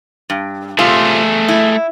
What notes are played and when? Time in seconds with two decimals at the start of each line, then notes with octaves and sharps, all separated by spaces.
0.30 G2
0.79 C3 A3 F4 G#4
1.48 E4